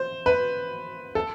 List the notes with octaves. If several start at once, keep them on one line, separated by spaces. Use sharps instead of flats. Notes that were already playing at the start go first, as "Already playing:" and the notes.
Already playing: C5
B4
A4